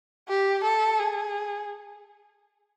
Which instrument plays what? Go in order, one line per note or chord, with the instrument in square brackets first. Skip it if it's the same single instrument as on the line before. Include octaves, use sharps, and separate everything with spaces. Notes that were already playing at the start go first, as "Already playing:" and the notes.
[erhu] G4
A4
G#4